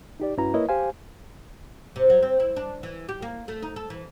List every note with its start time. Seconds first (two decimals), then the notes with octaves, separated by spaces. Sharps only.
0.20 D#4 G4 D5
0.38 G2 C#4 E4 F#4 B4 A#5
0.54 A#3 E4 A#4 B4 C#5 D#5
0.69 G4 C5 F5 G#5
1.96 C3
2.10 F#3
2.23 C4
2.40 E4
2.57 D4
2.83 E3
3.09 G4
3.22 A#3
3.48 A3
3.63 D#4
3.76 A4
3.90 E3